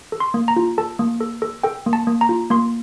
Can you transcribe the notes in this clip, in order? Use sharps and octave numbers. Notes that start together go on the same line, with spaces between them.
A4
C6
A#3
A#5
F4
A4 A5
A#3
A4
A4
A4 G5
A#3
A5
A#3
A#5
F4
A#3 C6